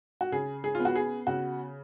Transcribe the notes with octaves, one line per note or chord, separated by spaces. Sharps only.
F#4
C#3 G#4
G#4
B3 F4
F#4
G#4
C#3 F#4